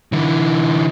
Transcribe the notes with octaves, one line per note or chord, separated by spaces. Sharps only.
D3 E3